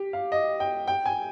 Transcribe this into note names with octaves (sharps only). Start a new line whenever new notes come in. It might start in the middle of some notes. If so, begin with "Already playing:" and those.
Already playing: G4
F5
D#5
G5
G5
G#5